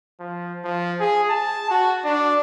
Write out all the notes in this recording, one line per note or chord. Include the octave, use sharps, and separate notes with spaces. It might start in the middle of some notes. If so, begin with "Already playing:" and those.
F3
F3
G#4
A5
F#4
D4